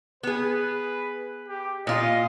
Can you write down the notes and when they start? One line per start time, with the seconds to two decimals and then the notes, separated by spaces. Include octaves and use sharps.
0.23 B3 G#4 B4
1.48 G4
1.87 A#2 F4 D#5